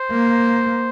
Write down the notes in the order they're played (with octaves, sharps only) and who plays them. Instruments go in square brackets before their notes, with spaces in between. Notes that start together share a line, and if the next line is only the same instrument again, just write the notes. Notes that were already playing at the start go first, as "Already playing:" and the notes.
Already playing: [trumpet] C5
[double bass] A#3